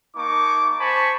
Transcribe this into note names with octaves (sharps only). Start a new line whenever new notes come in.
A#3 D#4 A5 C#6 D6
C5 G#5 A5 B5 C#6